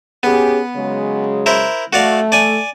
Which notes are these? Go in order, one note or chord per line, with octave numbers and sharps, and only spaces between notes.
B3 C#4 G4 G#4
C#3 F#3 G#3
E4 A#4 C5
A3 F#4 D5 F5
D5 G#5